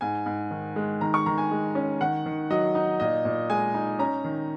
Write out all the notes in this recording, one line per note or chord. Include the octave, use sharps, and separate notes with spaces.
G#2 G#5
G#2
D#3
G#3
D#3 A#5
C#6
D#3 A#5
G#5
G#3
C#4
D#3 F#5
D#3
F#3 D#5
D#4
A#2 D#5
A#2
G#3 G#5
D#4
C#4 A#5
D#3